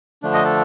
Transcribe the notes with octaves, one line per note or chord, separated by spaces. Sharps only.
D3 F3 A3 D4
D#5
A4